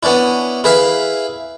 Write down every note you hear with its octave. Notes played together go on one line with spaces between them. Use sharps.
B3 C#4 D4 E4
E4 G#4 B4 E5 F5